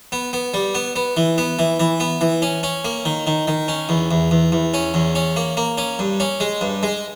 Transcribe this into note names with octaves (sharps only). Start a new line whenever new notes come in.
B3
B3
G3
B3
B3
E3
B3
E3
E3
B3
E3
C#4
C#4
A#3
D#3
D#3
D#3
C#4
E2
E2
E2
E2
C#4
E2
C#4
A#3
A#3
C#4
G2
C#4
G#3
G2
G#3